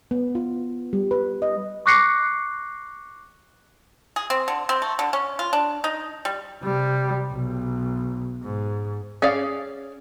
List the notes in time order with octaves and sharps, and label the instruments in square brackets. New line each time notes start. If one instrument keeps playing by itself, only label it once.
[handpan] B3
F4
G3
B4
D#5
[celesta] C#6 D6 F#6 A#6 C7 C#7
[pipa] G#4
C4
D3
C4
A3
D3
C#4
F4
D4
D#4
G3
[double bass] C3 G3
B1
G#2
[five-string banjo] C#4 G#4 D5 F5